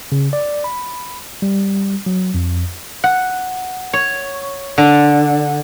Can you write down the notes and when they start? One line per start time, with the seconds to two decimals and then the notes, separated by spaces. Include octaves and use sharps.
0.12 C#3
0.33 D5
0.64 B5
1.42 G3
2.06 F#3
2.34 F2
3.04 F#5
3.93 C#5
4.78 D3